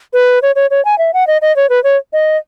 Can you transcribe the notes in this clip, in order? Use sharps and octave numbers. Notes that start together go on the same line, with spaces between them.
B4
C#5
C#5
C#5
G#5
E5
F#5
D#5
D#5
C#5
B4
C#5
D#5